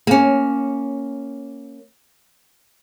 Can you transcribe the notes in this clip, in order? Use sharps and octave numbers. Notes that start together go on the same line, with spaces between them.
A#3 C#4